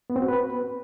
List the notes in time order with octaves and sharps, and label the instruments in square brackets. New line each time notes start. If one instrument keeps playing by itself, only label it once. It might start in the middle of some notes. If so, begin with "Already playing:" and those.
[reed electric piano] B3
C4
F#4
B4